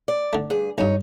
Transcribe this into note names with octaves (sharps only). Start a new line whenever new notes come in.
D5
D3 A3
G2 G#4
B1 G2 D#4 C#5